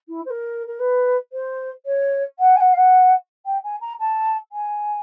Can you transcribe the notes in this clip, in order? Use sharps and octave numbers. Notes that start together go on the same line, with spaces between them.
E4
C5
A#4
A#4
B4
C5
C#5
F#5
G#5
F#5
F5
F#5
G5
G#5
A#5
A5
G#5